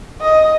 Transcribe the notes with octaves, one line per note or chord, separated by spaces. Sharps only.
D#5